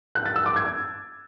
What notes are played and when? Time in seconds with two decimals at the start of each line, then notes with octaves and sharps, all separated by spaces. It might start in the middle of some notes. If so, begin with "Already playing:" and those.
0.15 F#6
0.26 A6
0.36 E6
0.46 D6
0.56 G#6